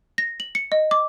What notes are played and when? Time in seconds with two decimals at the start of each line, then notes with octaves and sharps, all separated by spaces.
0.18 A#6
0.40 F#7
0.55 C#7
0.72 D#5
0.91 D6